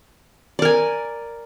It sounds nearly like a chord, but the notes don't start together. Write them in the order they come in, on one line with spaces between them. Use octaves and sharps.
D5 A#4 G#5